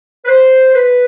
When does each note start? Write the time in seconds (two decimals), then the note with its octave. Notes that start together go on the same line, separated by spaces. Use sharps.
0.25 B4
0.29 C5
0.75 B4